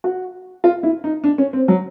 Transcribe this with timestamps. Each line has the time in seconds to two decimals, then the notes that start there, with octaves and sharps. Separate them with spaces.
0.04 F#4
0.64 F4
0.83 E4
1.04 D#4
1.24 D4
1.38 C#4
1.53 C4
1.68 F#3